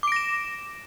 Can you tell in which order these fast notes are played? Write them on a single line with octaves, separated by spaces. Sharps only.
D6 D7 A#6 E7